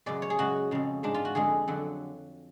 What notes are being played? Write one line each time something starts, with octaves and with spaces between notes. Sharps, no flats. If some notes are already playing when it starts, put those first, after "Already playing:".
F#2 C#3 G#3 D5
C#5
G#4
F#2 C#3 G#3 F#4
F2 C#3 G#3
G#2 G#3 D4
F4
F#4
F2 D3 G#3 G#4
F2 D3 F#3